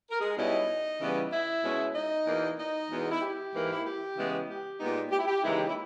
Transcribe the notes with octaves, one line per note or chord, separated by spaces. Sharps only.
A#4
G#3 G#4
B2 G3 C#4 D#4 E4 D#5
C#3 E3 G3 B3
E4 E5
B2 G#3 C#4
D#4 D#5
E2 B2 A#3
D#4 D#5
E2 B2 G#3 B3
E4
G4
G#2 E3 A#3
E4
G4
C#3 E3 G#3 B3
G4
A#2 G#3 B3 D#4
G4
E4
G4
D#2 C#3 E3 G#3 D#4 E4
G4
E4